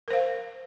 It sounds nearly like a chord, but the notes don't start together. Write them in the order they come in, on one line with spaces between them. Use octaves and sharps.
A#4 C5 F5